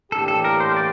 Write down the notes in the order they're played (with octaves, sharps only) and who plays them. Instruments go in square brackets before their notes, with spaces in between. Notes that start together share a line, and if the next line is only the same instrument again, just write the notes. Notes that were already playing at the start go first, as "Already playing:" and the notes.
[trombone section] A2 E3 A#3 D4 G4 [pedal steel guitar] A4
[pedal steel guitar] A4
A#4
C5
D5